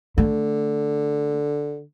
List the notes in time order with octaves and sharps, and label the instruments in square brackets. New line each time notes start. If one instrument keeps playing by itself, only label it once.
[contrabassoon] D3 [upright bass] A3